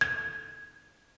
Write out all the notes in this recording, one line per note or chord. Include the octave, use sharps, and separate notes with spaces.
G#6